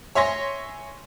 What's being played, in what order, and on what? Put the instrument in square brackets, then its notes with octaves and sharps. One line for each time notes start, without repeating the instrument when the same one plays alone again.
[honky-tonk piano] C#5 E5 G#5 C6 C#6 A#6